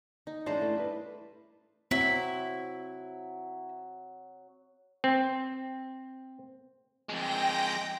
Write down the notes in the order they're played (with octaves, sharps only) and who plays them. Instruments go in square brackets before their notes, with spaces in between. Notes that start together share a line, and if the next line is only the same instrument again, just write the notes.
[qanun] D#4
[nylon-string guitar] E3 G#3 C#4 [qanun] D4 C5 A#5
[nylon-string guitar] A3
G3 E4 B4
[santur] F#3 [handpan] C4 [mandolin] E4
[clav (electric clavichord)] C4
[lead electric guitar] F2 G#3 [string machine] G5 G6 A#6